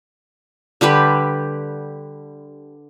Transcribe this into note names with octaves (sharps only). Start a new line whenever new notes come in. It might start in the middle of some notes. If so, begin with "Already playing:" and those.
D3 G3 G4 B4